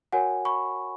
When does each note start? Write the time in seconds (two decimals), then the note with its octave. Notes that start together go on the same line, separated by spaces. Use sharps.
0.13 F#4 A#4 C#5 F#5 G#5
0.45 B5 C#6